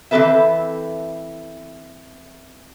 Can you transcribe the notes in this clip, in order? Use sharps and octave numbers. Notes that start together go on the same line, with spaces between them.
E3 C4 C#4 A4 B4 E5